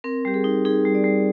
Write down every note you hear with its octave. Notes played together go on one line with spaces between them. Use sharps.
C4 A#4
G3 G4
G#4
D#4
D#4 G#4
G3
D5
G3